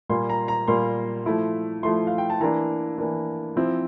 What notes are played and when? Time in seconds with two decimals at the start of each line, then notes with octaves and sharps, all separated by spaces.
0.09 A#2 G3 A#3 C6
0.30 A#5
0.48 A#5
0.68 A#2 G3 A#3 C6
1.26 F3 A3 E4
1.83 F3 A3 E4 C6
2.07 F5
2.18 G5
2.30 A5
2.40 E3 A#3 D4 A#5
2.98 E3 A#3 D4
3.56 F3 C4 E4